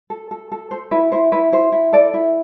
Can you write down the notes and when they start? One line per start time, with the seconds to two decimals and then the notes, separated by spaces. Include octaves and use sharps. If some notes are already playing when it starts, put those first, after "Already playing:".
0.10 A4
0.31 A4
0.52 A4
0.71 A4 C5
0.91 E4 B4
1.12 E4 C5
1.32 E4 B4
1.52 E4 C5
1.72 E4
1.93 A4 D5
2.14 E4